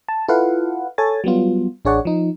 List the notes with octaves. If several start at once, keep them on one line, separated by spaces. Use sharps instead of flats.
A5
E4 F4 A4 B4 F5 F#5
A4 C#5 G#5 A6
F#3 G3 B3 F4
A1 D4 G#4 C#5 D5 F#5
F3 D#4